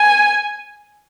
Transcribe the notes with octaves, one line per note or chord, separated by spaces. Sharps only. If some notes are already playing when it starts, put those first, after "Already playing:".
Already playing: G#5